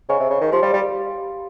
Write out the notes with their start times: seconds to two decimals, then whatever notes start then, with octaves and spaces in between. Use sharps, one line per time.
0.09 C#3 C5 D#5 G#5 C#6
0.20 C3
0.30 C#3
0.41 D#3
0.52 F3 G4 C5 F5 C6
0.63 G3
0.74 G3